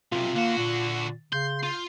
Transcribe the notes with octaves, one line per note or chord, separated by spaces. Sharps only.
B1 C3 F4
D3 A#3 F#4
A#2
C#3 C6 G6
F4